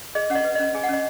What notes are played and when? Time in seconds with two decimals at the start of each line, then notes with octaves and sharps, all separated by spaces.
0.15 G#4 D#5
0.30 C#4 F#5
0.35 D#5
0.45 B4
0.55 C#4 D#5
0.75 G#4 G#5
0.83 F#5
0.89 C#4 D#5